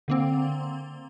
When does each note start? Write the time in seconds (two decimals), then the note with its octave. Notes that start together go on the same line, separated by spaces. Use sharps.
0.08 D3 A#3 C4